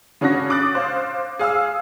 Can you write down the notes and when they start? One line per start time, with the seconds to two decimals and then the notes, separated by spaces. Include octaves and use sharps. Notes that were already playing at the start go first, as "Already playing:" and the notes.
0.21 C#3 C#4 D4 F#4 C#5 A#6
0.50 D6 D#6 F#6 A6
0.75 C5 F5
1.39 G#4 F5 D#6 E6